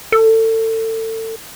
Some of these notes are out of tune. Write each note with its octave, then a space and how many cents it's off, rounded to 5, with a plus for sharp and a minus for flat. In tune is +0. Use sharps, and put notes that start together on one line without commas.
A4 +30